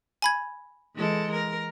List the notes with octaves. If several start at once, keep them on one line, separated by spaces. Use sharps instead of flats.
G#5 B5 G#6
E3 G#3 A4
A#4